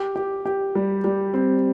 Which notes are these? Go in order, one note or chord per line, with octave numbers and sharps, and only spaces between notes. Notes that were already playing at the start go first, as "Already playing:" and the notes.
Already playing: G4
G4
G4
G3
G3
C4